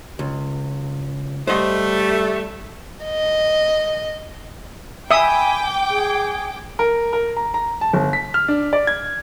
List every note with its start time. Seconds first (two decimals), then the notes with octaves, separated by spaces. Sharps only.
0.19 C#2
1.47 G3 A3 C5 D#5
3.05 D#5
5.11 E5 G5 G#5 B5 D6 D#6
5.89 G#4
6.79 A#4
7.13 A#4
7.37 A#5
7.54 A#5
7.81 A5
7.93 G1
8.13 B6
8.34 F6
8.48 D4
8.73 D5
8.87 G#6